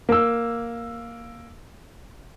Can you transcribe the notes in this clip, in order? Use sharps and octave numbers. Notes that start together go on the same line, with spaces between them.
A#3 E6